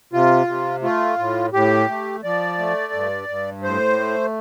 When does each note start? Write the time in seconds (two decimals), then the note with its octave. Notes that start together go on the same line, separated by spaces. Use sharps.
0.13 C3 F4
0.47 C3
0.82 A3 F4
1.18 A2
1.53 A2 G4
1.88 A3
2.24 F3 D5
2.59 A3
2.93 G2
3.29 G2
3.63 A2 C5
3.99 A3